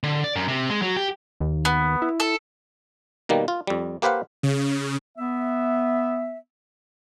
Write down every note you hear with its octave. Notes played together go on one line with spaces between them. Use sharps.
D3
D5
F#2
C3
G#3
F#3
G4
D#2
B3
E4
A4
B2 D#3 G3 A#3
F4
F2 G3
A#3 G4 B4 C5 F5 F#5
C#3
B3 E5